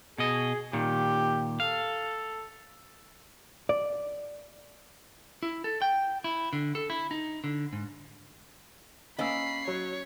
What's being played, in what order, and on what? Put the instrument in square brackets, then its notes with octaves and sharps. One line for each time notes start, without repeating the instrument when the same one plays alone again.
[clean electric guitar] B2 D#5 [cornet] G#4
[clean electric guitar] A#2 D#3 [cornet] G4
[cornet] A4 [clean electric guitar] F5
[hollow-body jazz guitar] D5
[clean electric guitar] E4
A4
G5
E4
D3
A4
E4
D#4
D3
G#2
[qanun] A#3 C#4 [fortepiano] D#5 E6 [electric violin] B5 C7
[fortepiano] F#3 [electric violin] C#5